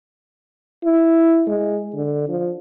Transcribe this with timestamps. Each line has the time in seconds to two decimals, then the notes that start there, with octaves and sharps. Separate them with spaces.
0.85 E4
1.47 G#3
1.94 D3
2.29 F3